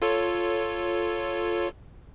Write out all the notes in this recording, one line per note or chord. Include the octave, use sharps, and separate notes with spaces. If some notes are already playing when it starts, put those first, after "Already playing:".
F4 A4 C#5